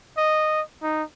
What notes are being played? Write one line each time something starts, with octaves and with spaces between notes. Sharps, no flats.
D#5
D#4